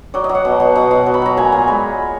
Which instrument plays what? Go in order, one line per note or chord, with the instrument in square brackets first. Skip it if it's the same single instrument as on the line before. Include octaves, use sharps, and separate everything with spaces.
[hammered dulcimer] F#3 D5
D#5
F#3
F#5
B2
B2
B2 F#5
B2
F#3
B5
F#3 A#5
A#2 G#5
A#2
G#3 B5